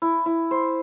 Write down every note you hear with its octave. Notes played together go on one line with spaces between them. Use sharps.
E4
E4
C5